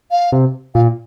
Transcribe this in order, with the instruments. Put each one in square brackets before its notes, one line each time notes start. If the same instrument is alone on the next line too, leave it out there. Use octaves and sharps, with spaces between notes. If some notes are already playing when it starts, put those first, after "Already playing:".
[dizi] F5
[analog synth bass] C3
[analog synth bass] A#2 [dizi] F5